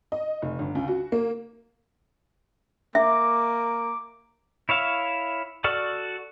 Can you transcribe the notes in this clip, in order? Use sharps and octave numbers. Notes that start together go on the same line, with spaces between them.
D#5
F1
G1
C#2
F#4
A#3
A#3 E5 D6
E4 C#5 E5 F5
F#4 A4 D5 C#6 F6